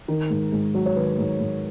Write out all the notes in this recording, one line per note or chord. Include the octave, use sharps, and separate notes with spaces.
D#3 A#4
G#2
G#2
F#3
C#5
D#3 B4
G#2
G#2